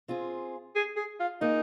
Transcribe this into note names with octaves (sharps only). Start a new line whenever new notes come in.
C4 F4 G#4
G#4
G#4
F4
A#3 D#4 F4 G#4